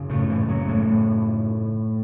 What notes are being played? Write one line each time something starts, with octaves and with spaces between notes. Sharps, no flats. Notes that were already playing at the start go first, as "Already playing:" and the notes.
Already playing: F#2 C#3
A2 A3
E3
A3
F#3
A2 A3